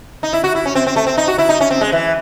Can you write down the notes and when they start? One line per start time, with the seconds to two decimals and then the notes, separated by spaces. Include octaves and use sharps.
0.23 D#4
0.33 E4
0.44 F#4
0.55 E4
0.66 C#4
0.75 C4
0.87 C4
0.96 A3
1.07 C4
1.18 D#4
1.28 F#4
1.38 E4
1.49 D#4
1.61 C#4
1.71 C4
1.81 G#3
1.92 E3